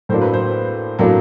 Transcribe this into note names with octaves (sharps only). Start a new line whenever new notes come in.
A2 F#3 A#3 D4 C5
B4
C5
A2 F#3 A#3 D4